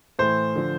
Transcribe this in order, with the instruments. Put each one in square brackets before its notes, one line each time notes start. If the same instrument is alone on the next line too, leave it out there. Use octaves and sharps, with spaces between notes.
[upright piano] A2 E3 A3 [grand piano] C5
[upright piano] D3 F3